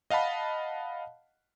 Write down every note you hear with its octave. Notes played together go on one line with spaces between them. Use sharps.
D#5 F5 F#5 A5 B5